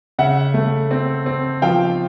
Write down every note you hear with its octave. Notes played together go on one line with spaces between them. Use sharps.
C#3 E5 F#5
A3
C4
C4
F3 F5 G5